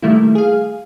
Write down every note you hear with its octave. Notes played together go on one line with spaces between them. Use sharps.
D#3 G3 A3 A#3 E4
G#4 F5